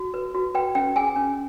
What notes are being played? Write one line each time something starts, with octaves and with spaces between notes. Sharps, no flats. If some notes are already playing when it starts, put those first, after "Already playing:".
Already playing: F#4
B4
F#4
B4 G5
C#4 G5
G#4 G#5
C#4